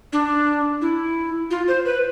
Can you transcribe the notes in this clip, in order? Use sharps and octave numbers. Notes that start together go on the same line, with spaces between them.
D4
E4
F4
C5
B4